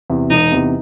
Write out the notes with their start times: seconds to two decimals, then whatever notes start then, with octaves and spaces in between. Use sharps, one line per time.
0.10 E2 C3
0.30 E1 D#4
0.52 E2 C3